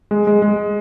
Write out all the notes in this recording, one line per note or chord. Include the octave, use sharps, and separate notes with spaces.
G#3
G#3
G#3